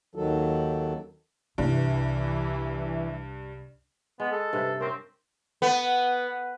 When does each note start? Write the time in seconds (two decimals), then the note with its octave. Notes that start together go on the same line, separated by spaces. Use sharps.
0.15 D#2 D#3 F#3 A4
1.58 C2 G2 E3
4.20 G#3 B3
4.32 G#4 A4
4.53 G2 C3 B4 C5
4.81 C4 C#4 G4 A#4
5.62 B3